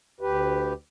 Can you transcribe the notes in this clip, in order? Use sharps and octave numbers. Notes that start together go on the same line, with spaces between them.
D2 G4 B4